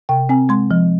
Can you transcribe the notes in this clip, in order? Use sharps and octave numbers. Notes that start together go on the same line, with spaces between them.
C3 G5
C4 G#5
G#3 C6
F3